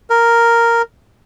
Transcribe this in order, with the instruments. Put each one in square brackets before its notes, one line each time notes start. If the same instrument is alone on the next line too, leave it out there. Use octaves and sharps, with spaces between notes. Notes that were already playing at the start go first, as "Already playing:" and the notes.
[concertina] A#4